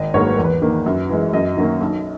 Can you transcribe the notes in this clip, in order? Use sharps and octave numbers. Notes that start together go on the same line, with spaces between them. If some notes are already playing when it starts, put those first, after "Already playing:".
Already playing: G#1 D#5
G#2 F#3 A#3 C#5
B4
E2 A#4
B4
D#3 A#3
F#2
E3 G#3
F#2 D#5
D#3 F#3 A#3 C#4
B1